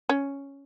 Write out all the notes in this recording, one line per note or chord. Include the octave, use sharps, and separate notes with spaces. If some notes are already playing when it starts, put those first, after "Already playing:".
C#4